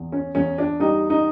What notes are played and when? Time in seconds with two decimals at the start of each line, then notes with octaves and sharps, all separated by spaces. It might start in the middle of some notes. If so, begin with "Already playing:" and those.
Already playing: E2
0.12 C#4
0.35 E2 C#4
0.58 D4
0.80 G3 D#4
1.10 D#4